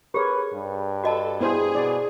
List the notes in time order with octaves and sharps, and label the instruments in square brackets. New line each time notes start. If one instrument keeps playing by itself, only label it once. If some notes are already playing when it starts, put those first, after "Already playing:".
[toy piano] G4 G#4 [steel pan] A#4 C#5 [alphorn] B4
[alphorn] G2
[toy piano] F#4 D#5 A5 [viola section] A4
[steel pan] B3 E4 C5 [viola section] G#4
[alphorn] B2 [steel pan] D5